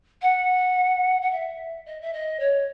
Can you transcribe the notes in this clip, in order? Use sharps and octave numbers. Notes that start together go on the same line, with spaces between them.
F#5
F#5
E5
D#5
E5
D#5
C#5